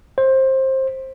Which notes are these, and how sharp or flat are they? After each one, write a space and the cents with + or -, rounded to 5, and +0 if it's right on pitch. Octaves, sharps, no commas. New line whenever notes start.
C5 +20